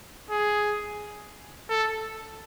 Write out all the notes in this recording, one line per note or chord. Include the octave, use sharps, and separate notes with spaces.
G#4
A4